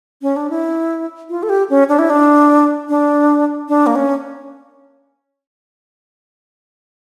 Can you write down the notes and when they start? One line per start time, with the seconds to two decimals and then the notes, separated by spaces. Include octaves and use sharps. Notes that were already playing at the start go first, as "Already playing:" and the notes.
0.22 C#4
0.36 D4
0.50 E4
1.30 F4
1.43 A4
1.49 G4
1.70 C#4
1.89 D4
1.99 E4
2.10 D4
2.89 D4
3.68 D4
3.86 A#3
3.95 C#4